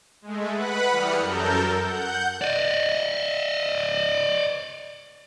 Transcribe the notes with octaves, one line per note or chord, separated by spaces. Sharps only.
G#3 A3
B4 F#5 B5 F#6
E3 G3 D#6 F6 C#7
F#2 A4 A#4 G6
F#5 G6
D5 D#5